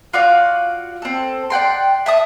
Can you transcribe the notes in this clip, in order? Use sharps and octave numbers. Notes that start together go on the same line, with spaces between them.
F4 F#4 D5 F5
C4 A4
D5 F#5 G5 C6
E5 A5 D#6